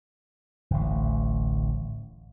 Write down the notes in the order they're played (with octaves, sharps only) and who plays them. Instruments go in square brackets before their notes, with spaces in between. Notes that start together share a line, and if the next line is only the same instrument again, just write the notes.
[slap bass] D1 A1